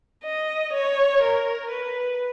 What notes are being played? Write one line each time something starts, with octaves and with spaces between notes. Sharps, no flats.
D#5
C#5
A#4
B4